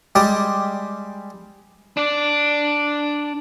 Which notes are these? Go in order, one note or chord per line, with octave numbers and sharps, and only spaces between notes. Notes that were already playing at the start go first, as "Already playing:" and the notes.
G3 G#3 G4 D5
D4 D5